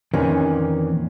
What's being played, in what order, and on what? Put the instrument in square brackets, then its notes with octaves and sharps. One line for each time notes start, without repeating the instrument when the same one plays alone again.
[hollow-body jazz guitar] F2 A#2 D#3 E3 C#4